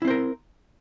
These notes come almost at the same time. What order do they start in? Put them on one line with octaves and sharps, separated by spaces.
E4 C4 C5 A#4